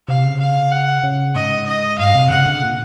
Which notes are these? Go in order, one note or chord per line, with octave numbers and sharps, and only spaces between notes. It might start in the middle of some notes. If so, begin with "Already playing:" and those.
C3 F5
C#3
F5
F#5
C#3
G#2 D#5
D#5
G2 F5
C3
C#3 F#5
D3
A#2